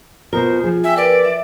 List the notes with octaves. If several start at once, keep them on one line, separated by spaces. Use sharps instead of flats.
B2 B3 F4 A#4 C5
F3 G#4
E5 G5 G#5
A#4 B4 D5 E6
E5